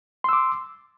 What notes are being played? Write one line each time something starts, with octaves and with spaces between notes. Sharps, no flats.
C6 D6 E6